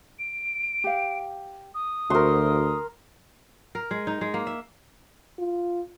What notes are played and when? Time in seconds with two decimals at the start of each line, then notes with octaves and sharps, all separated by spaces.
0.19 D7
0.84 G4 F5
1.74 D#6
2.10 D2 F#4 A#4 C5 E5 C6
3.75 A#4
3.91 G#3
4.07 D#4
4.21 G#3
4.34 A#3
4.47 E5
5.39 F4